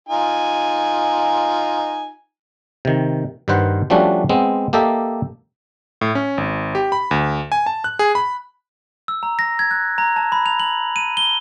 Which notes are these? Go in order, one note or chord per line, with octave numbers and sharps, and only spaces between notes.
D#4 F4 G#5
C3 D#3
G2 D#3 B4 C5 F#5
F3 G3 A3 C#4 D4 F#4
G#3 B3 C4
A#3 G4 A4 D#5 E5
A2
C#4
G#1
G4
B5
D2
G#5
A5
F#6
G#4
B5
E6
A#5
A#6
G#6
F#6
A#5
A5
B5
F7
F#7
D#7
G7